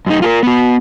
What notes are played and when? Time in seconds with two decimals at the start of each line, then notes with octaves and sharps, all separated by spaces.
0.07 F#2 D#4
0.22 F4 A4 A#4
0.43 B3 F#4